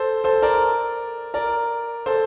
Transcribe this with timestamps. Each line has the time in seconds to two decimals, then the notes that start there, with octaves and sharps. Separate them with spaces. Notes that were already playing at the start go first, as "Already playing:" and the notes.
Already playing: A4 C5
0.24 A4 C5
0.42 A#4 D5
1.34 A#4 D5
2.06 A4 C5